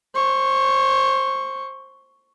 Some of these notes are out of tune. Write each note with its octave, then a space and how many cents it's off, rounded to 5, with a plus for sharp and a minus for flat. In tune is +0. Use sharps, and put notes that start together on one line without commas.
C5 +20 C#6 +0